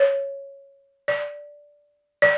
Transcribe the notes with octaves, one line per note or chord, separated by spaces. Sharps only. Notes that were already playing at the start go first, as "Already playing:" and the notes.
Already playing: C#5
D5
D5